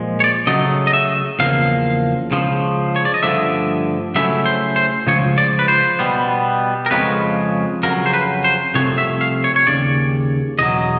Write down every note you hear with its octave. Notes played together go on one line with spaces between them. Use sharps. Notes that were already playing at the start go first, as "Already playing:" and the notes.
Already playing: A#2 F3 G#3
C#5
D5
C#3 F#3 A3 D#5
D#5
E5
E2 C#3 F3 A#3 F5
C#2 C#3 F3
C#5
D5
D#5
G2 D3 F3 A3 D4 E5
C#3 F#3 A3 C#4 E4 E5
C5
C5
C#2 C#3 F3 C#5
D5
B4
C5
B2 G3 B3
A#4
F2 C#3 F3 G#3 C#4 B4
F2 C#3 F#3 A#4
C5
B4
C5
C2 C3 F3 A3 C#5
E5
F5
C#5
C#5
D#2 C#3 D5
E2 B2 F#3 D#5